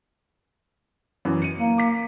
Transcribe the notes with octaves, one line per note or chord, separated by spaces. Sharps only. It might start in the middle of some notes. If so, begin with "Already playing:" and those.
F#2 E3
C#7 D#7
A#3
D6 B6